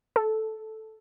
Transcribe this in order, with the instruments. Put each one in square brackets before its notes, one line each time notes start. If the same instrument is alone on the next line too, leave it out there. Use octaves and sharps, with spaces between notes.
[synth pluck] A4